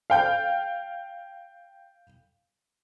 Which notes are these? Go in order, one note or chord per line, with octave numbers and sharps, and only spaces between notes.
F5 G5 G6